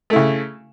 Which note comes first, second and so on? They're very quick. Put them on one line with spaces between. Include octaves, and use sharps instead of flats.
A3 E4 C#3